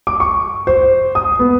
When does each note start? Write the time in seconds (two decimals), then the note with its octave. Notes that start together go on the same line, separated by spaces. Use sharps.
0.07 D6
0.20 C#6
0.67 C5
1.15 D#6
1.39 B3